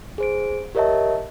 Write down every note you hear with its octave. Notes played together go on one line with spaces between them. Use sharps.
G#4 C5 D7
G4 A#4 C#5 D#5 E5 A5